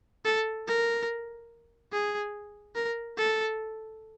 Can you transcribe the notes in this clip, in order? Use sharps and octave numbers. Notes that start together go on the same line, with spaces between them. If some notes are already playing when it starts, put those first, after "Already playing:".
A4
A#4
G#4
A#4
A4